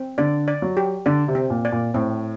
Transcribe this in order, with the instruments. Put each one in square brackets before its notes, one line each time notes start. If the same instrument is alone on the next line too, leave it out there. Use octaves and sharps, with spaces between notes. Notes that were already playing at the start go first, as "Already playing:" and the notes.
Already playing: [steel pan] C4
[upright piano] D3 [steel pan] D5
[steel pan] D5
[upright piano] F#3
[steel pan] G4
[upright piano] D3 [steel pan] D5
[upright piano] C3
[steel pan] C4
[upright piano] A#2
[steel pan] D5
[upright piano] A#2
[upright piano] A2 [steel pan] C4